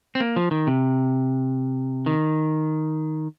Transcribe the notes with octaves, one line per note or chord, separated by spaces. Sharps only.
C4
A#3
F3
D#3
C3
D#3